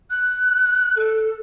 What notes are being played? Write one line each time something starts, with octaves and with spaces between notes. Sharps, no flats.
F#6
A4